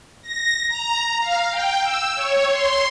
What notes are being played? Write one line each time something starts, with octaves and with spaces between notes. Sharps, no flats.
A#6
A#5
F5
G5
E6
C#5
C6